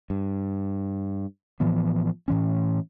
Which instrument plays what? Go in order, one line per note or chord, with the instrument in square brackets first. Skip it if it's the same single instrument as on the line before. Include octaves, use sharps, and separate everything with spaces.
[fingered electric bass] G2
A2 E3 F3 B3
A2 E3 C#4